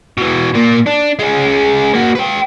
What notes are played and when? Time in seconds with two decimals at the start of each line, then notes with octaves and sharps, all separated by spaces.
0.17 B2 E3
0.54 A#2 A#3
0.86 D4
1.19 G#3 C#4
1.94 A#3 F#4
2.15 B4 G5